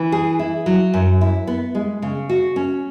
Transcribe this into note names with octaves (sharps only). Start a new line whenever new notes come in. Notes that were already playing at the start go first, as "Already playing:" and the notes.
Already playing: E3
G#4
E4
F#3
F#2
E4
B3
G#3
C#3
F#4
C#4